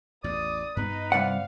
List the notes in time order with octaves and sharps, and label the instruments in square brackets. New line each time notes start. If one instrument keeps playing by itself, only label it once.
[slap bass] A1 E2 [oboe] D5 [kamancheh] D#6
[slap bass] G2 B3 [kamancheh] D#4 D#5 [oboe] B4
[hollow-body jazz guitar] C2 D5 F#5 [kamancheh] F5